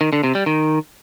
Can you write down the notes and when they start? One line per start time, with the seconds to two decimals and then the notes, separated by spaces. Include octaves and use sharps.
0.01 D#3
0.13 D3
0.23 C3
0.35 G3
0.46 D#3